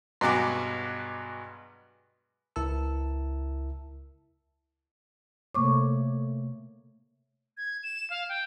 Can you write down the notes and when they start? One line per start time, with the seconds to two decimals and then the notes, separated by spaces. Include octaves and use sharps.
0.21 G2 B2 F#3 G#3 F#4 D6
2.56 C#2 E4 A#4 E5 A5 E6
5.55 C3 A3 A#3 C#5 C#6 D6
7.57 G#6
7.83 E7
8.10 F5
8.29 G5